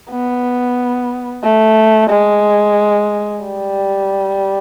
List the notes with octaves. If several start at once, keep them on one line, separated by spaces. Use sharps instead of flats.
B3
A3
G#3
G3